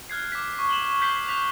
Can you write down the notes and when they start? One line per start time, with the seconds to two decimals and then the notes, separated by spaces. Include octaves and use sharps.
0.10 F6 F#6 G#6 C7
0.32 D6 B6
0.56 C#6 B6
0.69 E7 F#7 G7
1.01 G6 B6 C7 G7
1.28 F#6 B6 F7